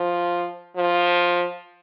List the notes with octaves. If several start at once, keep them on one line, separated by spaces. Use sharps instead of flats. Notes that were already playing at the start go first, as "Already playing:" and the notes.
Already playing: F3
F3